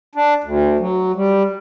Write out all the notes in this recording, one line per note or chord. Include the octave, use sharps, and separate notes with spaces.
D4
D2
F#3
G3